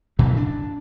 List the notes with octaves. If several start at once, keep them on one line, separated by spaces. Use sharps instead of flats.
A#2 C#3 E3 F#3
D4